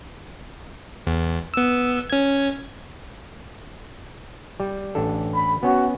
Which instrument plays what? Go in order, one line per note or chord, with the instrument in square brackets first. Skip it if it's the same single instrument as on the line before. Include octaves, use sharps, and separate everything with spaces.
[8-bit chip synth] E2
B3 E6
C#4 G#6
[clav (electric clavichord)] G3
A1 D4 A4
[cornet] B5
[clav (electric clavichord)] B3 C#4 [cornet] F#4